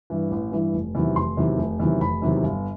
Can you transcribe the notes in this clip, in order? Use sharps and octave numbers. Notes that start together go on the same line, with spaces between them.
G2 E3
A1
G2 E3
F1
E2 C3 D#3 F#3
F1 C6
E2 C3 D#3 F#3
F1
E2 C3 D#3 F#3
F1 B5
E2 C3 D#3 F#3
G1